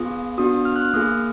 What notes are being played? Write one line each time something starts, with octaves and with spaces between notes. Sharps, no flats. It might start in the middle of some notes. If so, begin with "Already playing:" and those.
Already playing: B3 F4 G#4 D#6
B3 D4 F#4 D#6
F6
F#6
F6
A#3 F4 G#4 D#6